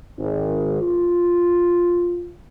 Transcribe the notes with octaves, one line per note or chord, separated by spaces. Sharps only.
G#1
F4